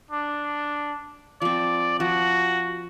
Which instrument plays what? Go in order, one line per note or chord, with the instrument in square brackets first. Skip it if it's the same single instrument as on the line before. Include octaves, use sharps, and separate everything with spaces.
[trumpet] D4
[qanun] F3 C4 [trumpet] D5
[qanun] F3 [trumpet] F#4